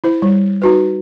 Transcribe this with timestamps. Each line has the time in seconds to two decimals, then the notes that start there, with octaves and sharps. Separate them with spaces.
0.04 E4 C5
0.22 G3
0.62 D#4 F#4 B4